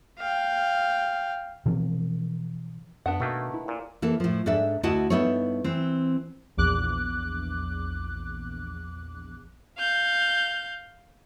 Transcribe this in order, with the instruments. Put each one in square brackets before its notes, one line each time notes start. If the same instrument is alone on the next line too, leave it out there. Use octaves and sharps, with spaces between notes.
[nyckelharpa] F5 G5
[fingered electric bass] B2 E3 F3 C4
[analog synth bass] F#2 [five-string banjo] B3 D4 F#5
[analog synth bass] B2 [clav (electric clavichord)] D#3 A3 A#3
[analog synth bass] E4
[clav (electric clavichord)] A#2
[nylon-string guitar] E3 A#3 A4
A2 F3
G#2 D4 A4 E5
D2 E4 F#4 D#5 F#5 A5
G2 B3 D#4 E4 A4 C#5
E3 C4
[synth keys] A#1 E2 D6 F#6
[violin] F5 G6